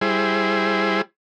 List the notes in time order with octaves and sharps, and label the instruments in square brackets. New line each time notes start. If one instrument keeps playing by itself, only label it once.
[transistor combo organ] G3 E4 G#4 C5